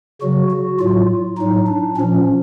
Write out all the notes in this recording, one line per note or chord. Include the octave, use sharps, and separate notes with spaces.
C#3 F#3 F#4
F#4
A2 F#3 F4
A2 F#3 D#4
D4
A#2 F3 C#4